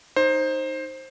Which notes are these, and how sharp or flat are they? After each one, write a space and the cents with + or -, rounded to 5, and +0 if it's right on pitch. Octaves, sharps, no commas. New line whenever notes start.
D#4 +0 C5 +15